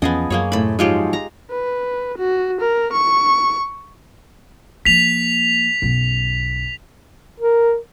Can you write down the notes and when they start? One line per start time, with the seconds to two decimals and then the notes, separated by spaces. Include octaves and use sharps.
0.02 E2 F3 B3 C#4 G#4 D#5 G#5
0.30 F#2 A#3 G#4 C#5
0.52 D#2 A2 C3 B5
0.79 G#2 F3 F#3 G#3 F4 G4
1.13 A#5
1.51 B4
2.18 F#4
2.61 A#4
2.93 C#6
4.85 F3 A#3 B6 F7
5.82 B1 F#2
7.40 A#4